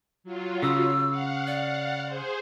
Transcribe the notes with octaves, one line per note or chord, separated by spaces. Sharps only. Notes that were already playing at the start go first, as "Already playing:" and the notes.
F#3 F4
C#3 E6
F5 F#5
D5
G#4 C5